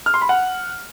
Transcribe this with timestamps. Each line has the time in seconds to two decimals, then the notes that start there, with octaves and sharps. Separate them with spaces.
0.06 F6
0.14 C6
0.22 B5
0.29 F#5